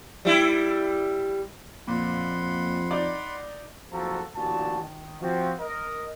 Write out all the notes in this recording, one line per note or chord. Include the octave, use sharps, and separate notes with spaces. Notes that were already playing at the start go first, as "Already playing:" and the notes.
G3 E4
F2 A#2 F#5 B5 C6
D#4 D5
F#1 F2 F3 F#4 A4 A#5
A1 D2 A#2 F#4 A5
D#3
F3 C4 F#4
A#4 D#5